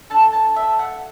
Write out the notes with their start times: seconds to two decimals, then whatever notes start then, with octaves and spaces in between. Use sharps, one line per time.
0.10 D4 A4 A5
0.33 A5
0.56 E5
0.79 F#5